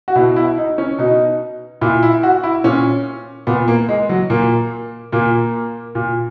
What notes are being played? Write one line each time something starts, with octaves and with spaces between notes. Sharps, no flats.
F#4
B2 E4
E4
D#4
C#4
B2 D#4
A#2 E4
E4
F#4
E4
A#2 C#4
A#2 B3
A#3
G#3
F#3
A#2 A#3
A#2 A#3
A#2